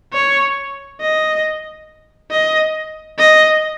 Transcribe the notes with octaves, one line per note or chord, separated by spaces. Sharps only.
C#5
D#5
D#5
D#5